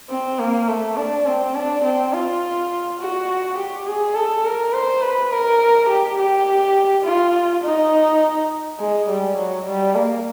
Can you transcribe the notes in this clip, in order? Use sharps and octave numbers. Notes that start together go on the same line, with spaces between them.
C4
A#3
A3
D4
C4
D4
C4
F4
F#4
G4
G#4
A4
A#4
C5
B4
A#4
G4
G4
F4
D#4
G#3
G3
F#3
G3
A#3